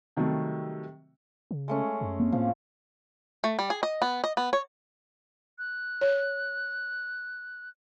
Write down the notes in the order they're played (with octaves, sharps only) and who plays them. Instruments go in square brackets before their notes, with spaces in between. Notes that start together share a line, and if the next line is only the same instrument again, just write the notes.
[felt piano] C3 D#3 F#3 G3 A3
[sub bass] C#3
[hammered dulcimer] G#3 A3 C#4
[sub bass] F#2
[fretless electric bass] A#3 C4
[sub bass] A2 [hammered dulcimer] F3
[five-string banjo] A3
G3
G#4
D#5
B3
D#5
B3
C#5
[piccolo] F#6
[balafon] C#5